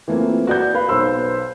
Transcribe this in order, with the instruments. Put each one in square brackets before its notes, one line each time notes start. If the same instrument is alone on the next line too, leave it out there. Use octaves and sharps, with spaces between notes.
[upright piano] E3 A3 A#3 C4 F4
F#4 D5 G6
B4 F5 B5
B1 B4 C5 C6 E6